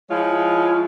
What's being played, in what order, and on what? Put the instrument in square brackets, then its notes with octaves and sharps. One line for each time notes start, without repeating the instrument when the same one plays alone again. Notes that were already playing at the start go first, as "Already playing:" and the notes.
[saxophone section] F3 G#3 E4 F4 C#5